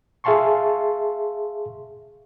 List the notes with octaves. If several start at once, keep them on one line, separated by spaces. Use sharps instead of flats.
G#4 E5 F5 A5 C6 C#6